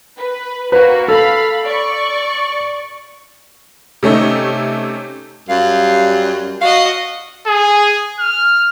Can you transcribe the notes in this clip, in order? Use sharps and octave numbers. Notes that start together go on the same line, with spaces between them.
B4
A#3 F#4 B4
A4 F5 B5
D5 C#6
C3 A3 C#4 D#4
F#2 G3 F5
F#4 D#5 F5
G#4
F6